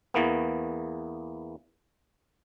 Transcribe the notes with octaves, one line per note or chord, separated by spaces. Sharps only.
E2 E3 A#3 B3